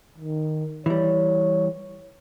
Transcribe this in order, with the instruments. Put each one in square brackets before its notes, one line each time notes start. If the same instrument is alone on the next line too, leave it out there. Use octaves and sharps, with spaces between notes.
[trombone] D#3
[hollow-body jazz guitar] E3 G3 [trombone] C#5